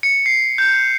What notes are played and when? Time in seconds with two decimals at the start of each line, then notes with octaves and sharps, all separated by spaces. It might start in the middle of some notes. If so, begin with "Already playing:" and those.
0.03 C#7
0.26 C7
0.58 G6